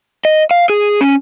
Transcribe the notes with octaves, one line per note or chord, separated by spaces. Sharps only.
D#5
F5
G#4
C#4